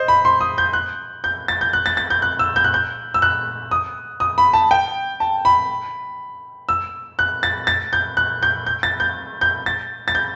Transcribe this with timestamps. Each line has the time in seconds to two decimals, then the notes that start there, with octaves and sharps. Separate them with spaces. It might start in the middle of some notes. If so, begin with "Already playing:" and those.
Already playing: C5 D#5
0.08 B5
0.25 C6
0.41 D#6
0.58 G6
0.73 F#6
1.24 G6
1.48 A6
1.61 G6
1.73 F#6
1.86 A6
1.97 A6
2.10 G6
2.22 F#6
2.39 E6
2.56 G6
2.64 F#6
2.74 G6
3.14 E6
3.22 F#6
3.71 D#6
4.20 D#6
4.38 B5
4.54 A5
4.71 G5
5.20 A5
5.45 B5
6.69 E6
7.19 F#6
7.43 A6
7.67 A6
7.93 G6
8.17 F#6
8.43 G6
8.66 G6
8.83 A6
9.00 G6
9.41 G6
9.66 A6
10.08 A6
10.15 G6